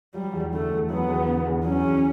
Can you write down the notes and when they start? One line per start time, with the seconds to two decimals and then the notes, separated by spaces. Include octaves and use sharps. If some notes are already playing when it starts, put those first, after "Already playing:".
0.14 F#3 G3
0.33 E2
0.53 D3 A3
0.71 E2
0.90 F#3 B3
1.09 E2
1.28 D3
1.47 E2
1.65 F#3 C#4
1.84 E2